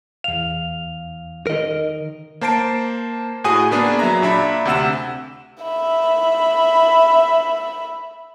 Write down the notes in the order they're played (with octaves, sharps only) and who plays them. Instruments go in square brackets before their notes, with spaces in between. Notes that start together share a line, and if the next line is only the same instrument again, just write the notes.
[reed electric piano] E2 F5 [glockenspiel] F7
[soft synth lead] D#3 [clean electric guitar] A#4 D#5
[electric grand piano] A#3 C5 A5 C7 D7
A2 F#4 G#4 G#5 D#6 D#7
A#3 B3 D4 G#4
F#3 E5 A#5
A#2 D4 E5 A#5 B5
D2 C3 F#5 E6 E7
[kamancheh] E5 B5